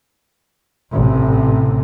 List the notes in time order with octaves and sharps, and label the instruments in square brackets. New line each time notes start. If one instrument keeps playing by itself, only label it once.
[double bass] A1 C3